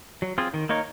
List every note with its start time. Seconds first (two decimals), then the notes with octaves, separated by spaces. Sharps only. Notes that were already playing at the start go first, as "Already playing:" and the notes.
0.22 F#3
0.38 C4 F4 G#4
0.54 D#3
0.69 A#3 D#4 A#4 C#5